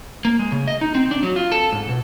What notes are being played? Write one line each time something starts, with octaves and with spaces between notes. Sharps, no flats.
A#3
G#3
C#3
D#5
D#4
C4
D4
F#3
F4
A4
G#2
B2